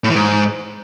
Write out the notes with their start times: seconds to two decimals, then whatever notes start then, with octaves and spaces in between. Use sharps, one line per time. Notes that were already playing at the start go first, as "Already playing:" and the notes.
0.04 A2
0.09 E3
0.15 G#2